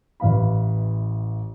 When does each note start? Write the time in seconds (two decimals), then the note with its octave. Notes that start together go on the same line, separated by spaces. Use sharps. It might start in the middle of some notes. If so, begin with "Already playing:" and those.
0.20 A1 E3 F5 B5